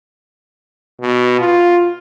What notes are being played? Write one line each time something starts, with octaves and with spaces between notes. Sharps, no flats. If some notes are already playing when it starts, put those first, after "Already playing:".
B2
F4